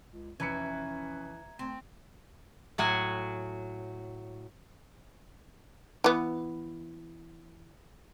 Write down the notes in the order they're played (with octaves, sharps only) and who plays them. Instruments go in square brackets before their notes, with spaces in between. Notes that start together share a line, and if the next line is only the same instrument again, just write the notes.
[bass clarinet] C#2
[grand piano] F1 B4 C#7 [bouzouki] E3 [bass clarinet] C#4 [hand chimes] A#5 G#6
[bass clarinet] A3 [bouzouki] C4
[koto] A2 F#3 F#5 G#5
[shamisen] E3 B3